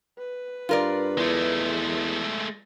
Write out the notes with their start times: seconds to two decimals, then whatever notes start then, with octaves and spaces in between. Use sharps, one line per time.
0.18 B4
0.69 G2 F4 A#4 D5
1.17 E2 G#3 A3